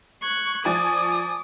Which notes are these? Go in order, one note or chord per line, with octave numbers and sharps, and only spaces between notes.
C#6 F#6 G#6
F3 D5 G#5 D6 D#6